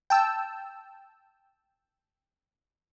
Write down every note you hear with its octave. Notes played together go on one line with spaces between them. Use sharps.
G5 A5 E6